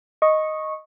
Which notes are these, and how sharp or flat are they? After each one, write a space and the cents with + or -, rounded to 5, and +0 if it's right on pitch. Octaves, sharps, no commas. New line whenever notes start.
D#5 +0 C#6 -15